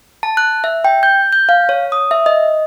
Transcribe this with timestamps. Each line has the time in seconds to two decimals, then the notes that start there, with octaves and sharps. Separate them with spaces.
0.23 A5
0.37 F#6
0.64 E5
0.84 G5
1.03 G6
1.33 G6
1.49 F5
1.69 C#5
1.92 D#6
2.11 E5
2.26 D#5